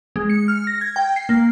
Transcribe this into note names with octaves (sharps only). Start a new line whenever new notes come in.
G#3
C#7
F6
A#6
G#6
G5
C7
A#3